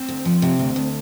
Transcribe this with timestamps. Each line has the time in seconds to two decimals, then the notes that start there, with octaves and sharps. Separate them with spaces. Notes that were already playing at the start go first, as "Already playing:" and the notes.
Already playing: C4
0.08 D2
0.25 F3
0.42 C3
0.59 D2
0.76 D2